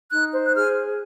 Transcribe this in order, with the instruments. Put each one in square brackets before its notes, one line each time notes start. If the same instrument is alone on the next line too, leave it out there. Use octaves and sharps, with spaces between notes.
[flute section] D#4 F#6
C5
F#6
G#4 F6